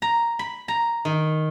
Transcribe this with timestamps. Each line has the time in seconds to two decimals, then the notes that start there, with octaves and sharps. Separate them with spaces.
0.02 A#5
0.39 B5
0.68 A#5
1.05 D#3